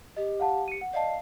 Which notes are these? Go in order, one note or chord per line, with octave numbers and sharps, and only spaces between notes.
G4 D#5
F5 F#5 A5
C#7 D#7
F#5
D5 D#5 F5 A5